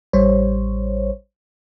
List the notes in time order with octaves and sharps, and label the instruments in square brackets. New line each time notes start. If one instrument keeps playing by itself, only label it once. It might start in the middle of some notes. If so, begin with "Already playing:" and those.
[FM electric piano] A1 G3 C5 C#5